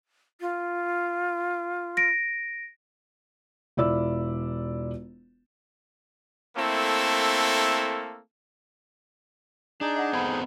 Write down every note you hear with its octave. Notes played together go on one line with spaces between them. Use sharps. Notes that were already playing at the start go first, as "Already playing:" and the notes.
F4
A#6 D7
E1 E4 F4 D5 E6
A3 A#3 C4 E4 A4
D4 D#4 G#4
D#5 F#5 A#5
B3 C4 A4 F#5 B5 G#6